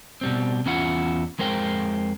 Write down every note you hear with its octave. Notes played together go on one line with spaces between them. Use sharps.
B2 G3 C4
E2 C#4 E4 F4 F#5
F2 G#3 A#4 C5 G5